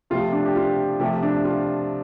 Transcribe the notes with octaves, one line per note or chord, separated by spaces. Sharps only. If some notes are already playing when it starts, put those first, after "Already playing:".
C3 F3 A3 F4
D4
G4
F4
C3 F3 A3 G4
D4
F4